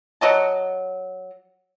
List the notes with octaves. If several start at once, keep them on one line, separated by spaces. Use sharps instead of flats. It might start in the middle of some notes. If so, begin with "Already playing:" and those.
F#3 D#5 A5